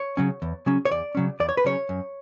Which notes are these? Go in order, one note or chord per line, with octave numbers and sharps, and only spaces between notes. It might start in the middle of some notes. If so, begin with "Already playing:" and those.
Already playing: C#5
C#3 F#3 C#4
E2
C#3 F#3 C#4
C#5
E2 D5
C#3 F#3 C#4
E2 D5
C#5
B4
C#3 F#3 C#4 C#5
F#2